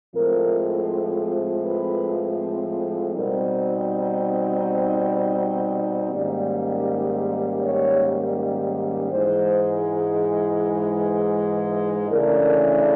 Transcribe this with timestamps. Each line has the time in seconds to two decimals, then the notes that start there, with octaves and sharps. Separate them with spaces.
0.14 A2 F3 G#3 C4 A#4
1.65 B4
3.14 B2 G3 C4 D#4 A#4
6.12 G#2 D#3 G3 A#3 C#4 D5
7.62 C#5
9.12 G#2 E3 G#3 C5
10.61 B4
12.11 C#3 E3 A3 D4 A#4